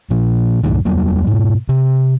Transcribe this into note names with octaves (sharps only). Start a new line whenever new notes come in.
A#2 F3
C2 F#2 A2 D#3
E2 F#3 G3 A#3
G#2 B2
C3